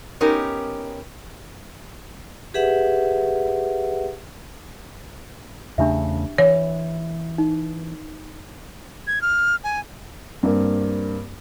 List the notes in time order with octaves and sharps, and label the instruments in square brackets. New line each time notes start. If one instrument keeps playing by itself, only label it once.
[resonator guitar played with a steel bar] B3 C#4 D#4 G4 A#4
[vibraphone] G4 G#4 B4 E5 F#5
[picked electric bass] E2 C#3 A3 [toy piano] D4 G4 E5
[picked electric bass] E3 [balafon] C#5
[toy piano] D#4
[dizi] G#6
F6
G#5
[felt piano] G2 A#3 C4